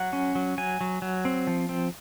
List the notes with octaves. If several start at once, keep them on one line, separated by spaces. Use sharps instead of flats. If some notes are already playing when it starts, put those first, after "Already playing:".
Already playing: F#3 F#5
C#4
F#3
F#3 G#5
F#3
F#3
C4
F3
C4